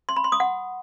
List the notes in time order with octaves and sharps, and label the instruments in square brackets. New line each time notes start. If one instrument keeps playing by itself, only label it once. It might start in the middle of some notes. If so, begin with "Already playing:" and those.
[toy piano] C6
B5
C6
D#6
F#5